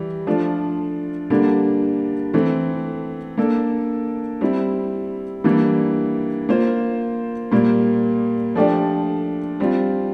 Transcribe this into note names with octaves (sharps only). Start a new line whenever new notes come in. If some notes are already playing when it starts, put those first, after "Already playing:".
Already playing: E3 G3
F3 A3 D4 F4
D3 G3 A#3 D4
E3 A3 C4
A#3 D4 A4
G3 C4 E4
E3 G3 A#3 D4
A#3 F4 C5
A#2 G3 A#3
F3 A3 D4 G4 D5
G3 C4 F4